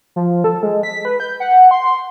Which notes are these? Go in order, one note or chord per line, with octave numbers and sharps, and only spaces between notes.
F3
A4
G#3
B6
B4
G6
F#5
C6